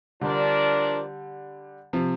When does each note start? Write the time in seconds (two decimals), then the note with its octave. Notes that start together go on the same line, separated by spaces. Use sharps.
0.21 D3 F3 G3 D4 A#4 D5
1.93 C3 F3